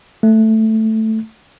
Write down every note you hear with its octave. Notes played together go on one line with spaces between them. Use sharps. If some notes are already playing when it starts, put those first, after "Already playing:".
A3